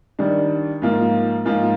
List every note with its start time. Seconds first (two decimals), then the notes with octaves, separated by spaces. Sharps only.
0.19 D#3 G3 D4
0.82 G#2 F3 A#3 F4
1.45 G#2 F3 A#3 F4